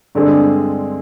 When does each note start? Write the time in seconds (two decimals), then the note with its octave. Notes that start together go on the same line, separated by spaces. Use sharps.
0.15 G2 D3 G#3 C4